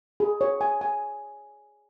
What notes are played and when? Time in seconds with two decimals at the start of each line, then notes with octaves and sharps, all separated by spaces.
0.20 G#4
0.41 C#5
0.61 G#5
0.81 G#5